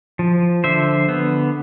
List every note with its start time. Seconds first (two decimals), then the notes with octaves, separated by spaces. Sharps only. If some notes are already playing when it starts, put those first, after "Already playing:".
0.19 F3
0.64 D3 C5 E5
1.09 B3